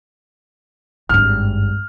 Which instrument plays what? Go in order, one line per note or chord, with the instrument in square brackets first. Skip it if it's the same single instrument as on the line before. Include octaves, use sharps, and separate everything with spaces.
[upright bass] G#1 G2 [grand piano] F6